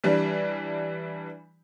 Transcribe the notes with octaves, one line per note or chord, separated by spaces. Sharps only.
E3 G3 D4